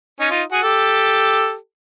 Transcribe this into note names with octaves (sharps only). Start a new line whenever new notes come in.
C#4 D#4
D#4 F4
F#4 G#4
G4 A4